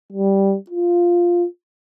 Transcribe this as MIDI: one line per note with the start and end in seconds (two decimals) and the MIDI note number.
0.12 0.56 55
0.70 1.46 65